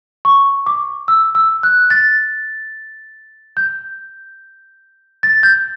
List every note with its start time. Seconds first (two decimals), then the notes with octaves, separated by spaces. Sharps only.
0.25 C#6
0.66 D6
1.08 E6
1.35 E6
1.63 F#6
1.90 A6
3.57 G6
5.23 A6
5.43 G6